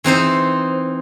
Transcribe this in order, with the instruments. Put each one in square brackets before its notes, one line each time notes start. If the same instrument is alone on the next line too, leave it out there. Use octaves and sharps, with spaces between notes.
[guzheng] E3 C4 D#4 C5